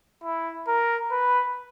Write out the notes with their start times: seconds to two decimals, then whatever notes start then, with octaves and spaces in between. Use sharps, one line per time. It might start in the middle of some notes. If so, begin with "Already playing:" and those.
0.24 E4
0.68 A#4
1.11 B4